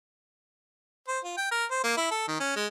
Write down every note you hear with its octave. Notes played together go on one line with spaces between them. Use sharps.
C5
F4
G5
A#4
C5
A#3
E4
A4
D#3
C#4
G#3